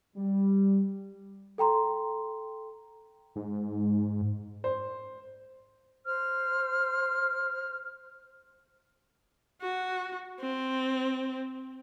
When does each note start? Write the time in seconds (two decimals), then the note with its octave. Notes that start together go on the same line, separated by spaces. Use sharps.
0.17 G3
1.58 A4 G5 A#5 C6
3.36 G#2
4.64 C5
6.05 C5 F6
9.61 F#4
10.40 C4